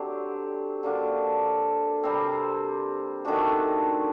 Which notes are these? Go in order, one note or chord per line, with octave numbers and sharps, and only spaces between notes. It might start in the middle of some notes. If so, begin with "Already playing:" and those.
Already playing: D3 F#3 C4 G4
D3 F#3 A#3 D4
C3 G3 C4
D#3 A3 D4 F#4